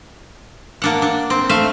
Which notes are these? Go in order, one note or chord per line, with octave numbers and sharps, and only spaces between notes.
A#3 D4 F#5
D4
C4
A3 E5 F5